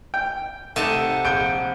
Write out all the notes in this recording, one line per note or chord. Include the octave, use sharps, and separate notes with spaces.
G5
C3 A3 D#4 F#5 A5
A#1 G6 D7